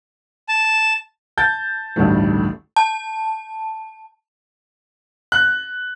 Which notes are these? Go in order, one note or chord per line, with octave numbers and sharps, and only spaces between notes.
A5
A5 G6 A6
A1 D2 G2 D#3 A3
A5
F#6